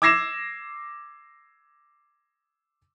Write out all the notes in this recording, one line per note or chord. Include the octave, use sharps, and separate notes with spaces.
D6 E6 G#6 A#6 C7 E7